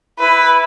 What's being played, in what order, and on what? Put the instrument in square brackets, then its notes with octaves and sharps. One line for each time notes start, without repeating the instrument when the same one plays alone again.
[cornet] E4 [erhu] B4